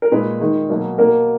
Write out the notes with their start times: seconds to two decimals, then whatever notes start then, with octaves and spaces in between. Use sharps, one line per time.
0.02 A#4
0.12 A#2 G#3 B4
0.40 D#3 G#3
0.69 B2 F#3 A#3
0.98 B2 A#3 A#4